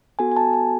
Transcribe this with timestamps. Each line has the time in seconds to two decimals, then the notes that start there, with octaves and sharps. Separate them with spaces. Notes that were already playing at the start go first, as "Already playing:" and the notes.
0.19 B3 F#4 A4 G#5
0.32 G#5
0.36 A5
0.53 G#5